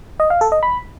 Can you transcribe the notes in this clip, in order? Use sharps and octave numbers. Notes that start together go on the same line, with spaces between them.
D#5
F5
A4
D#5
B5